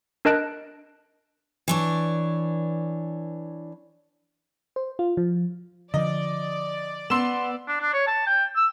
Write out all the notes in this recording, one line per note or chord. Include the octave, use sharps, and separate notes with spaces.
D4 A#4 D#5 A5 F#6 D7
E3 D4 C#5
C5
F4
F3
D3 F3 D5 D#5
B3 C6 E6 E7
D4
D4
C#5
A5
G5
E6